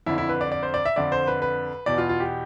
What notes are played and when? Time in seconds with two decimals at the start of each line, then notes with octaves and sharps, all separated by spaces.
0.06 F2 D3 E4
0.18 E4
0.29 B4
0.41 D5
0.52 D5
0.63 C5
0.74 D5
0.85 E5
0.96 F2 D3 D5
1.12 C5
1.27 B4
1.42 B4
1.86 E2 B2 D5
1.98 F4
2.09 F4
2.20 G4